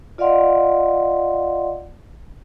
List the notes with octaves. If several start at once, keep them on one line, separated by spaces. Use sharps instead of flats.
F4 D5 D#5 F5 F#5 C6